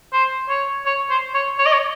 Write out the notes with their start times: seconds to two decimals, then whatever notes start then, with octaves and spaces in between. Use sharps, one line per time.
0.13 C5
0.49 C#5
0.86 C#5
1.10 C5
1.34 C#5
1.59 C#5
1.66 D#5
1.73 C#5